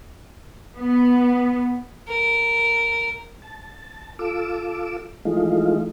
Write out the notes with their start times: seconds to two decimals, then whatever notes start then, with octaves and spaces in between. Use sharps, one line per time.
0.76 B3
2.08 A#4
3.42 A5
4.19 F4 A4 D6 E6
5.25 E3 F3 G#3 A3 D#4 F4